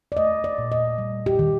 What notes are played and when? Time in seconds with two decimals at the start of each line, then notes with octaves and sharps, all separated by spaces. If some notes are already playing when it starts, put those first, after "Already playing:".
0.12 D5
0.17 A3 D#5
0.44 D5
0.58 A#2
0.72 D#5
0.98 G3
1.26 G4
1.39 D#3